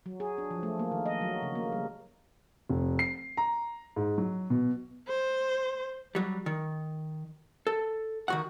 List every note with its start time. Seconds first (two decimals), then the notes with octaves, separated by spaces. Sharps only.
0.06 F#3
0.20 G#4
0.38 D4
0.51 F3
0.63 A3
0.79 A#3
0.92 D#3
1.06 D#5
1.21 F#3
1.42 C#3
1.55 A#3
1.72 G3
2.69 F1
2.99 C7
3.37 A#5
3.96 G#2
4.18 F#3
4.50 B2
5.08 C5
6.15 F#3 G3
6.46 D#3
7.67 A4
8.28 D#3 F#4 F#5